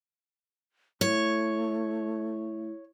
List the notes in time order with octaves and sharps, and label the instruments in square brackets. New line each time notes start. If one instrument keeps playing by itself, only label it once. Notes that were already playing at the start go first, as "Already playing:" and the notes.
[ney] A3 [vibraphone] E4 [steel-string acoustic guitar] C#5